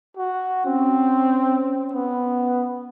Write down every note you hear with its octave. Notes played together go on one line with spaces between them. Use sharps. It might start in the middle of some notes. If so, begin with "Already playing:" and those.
F#4
C4 C#4
B3